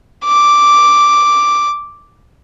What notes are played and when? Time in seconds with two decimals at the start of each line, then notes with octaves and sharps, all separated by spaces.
0.25 D6